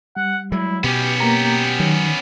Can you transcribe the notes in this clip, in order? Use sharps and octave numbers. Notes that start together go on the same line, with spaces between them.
G3 F#5
F#3 G#3 E4
B2 B3 C#4 G4
A#3 G4 A#5
D#3 F#3